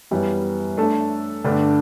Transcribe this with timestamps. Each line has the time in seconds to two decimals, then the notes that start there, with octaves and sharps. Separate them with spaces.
0.11 F#2 E3 G3 B3
0.77 A3 D4 A4
1.44 G2 D3 A3 D4